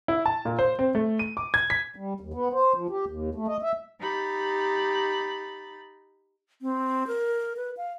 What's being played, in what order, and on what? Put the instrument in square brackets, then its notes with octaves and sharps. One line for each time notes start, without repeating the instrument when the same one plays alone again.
[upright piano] E4
A5
A#2
C5
C4
A3
D#7
D6
G#6
B6
[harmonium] G3
D#2
B3
C5
F3
G4
D#2
A3
D#5
E5
[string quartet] D#4 G4 B5 A6
[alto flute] C4
A#4
B4
F5